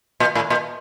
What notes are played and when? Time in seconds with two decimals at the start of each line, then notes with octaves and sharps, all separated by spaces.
0.20 A#2
0.35 A2
0.50 A#2